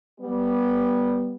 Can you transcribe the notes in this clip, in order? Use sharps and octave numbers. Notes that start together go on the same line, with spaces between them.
G3 B3